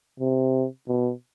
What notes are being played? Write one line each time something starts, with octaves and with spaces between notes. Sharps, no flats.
C3
B2